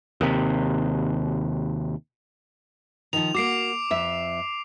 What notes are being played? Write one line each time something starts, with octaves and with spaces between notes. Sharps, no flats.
D#2 C3
D#3 F3 F7
A#3 F#4 D6 C7 D7
F2 E5